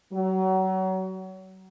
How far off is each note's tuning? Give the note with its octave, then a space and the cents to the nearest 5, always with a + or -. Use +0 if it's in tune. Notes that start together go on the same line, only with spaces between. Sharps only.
F#3 +30